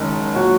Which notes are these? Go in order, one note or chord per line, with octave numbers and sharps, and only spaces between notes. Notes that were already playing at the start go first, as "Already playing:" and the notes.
Already playing: F#1 F#2 D#3 G#3 D#4
A#2 F#3 F#4